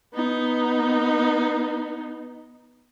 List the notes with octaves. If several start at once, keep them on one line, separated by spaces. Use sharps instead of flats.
B3 D#4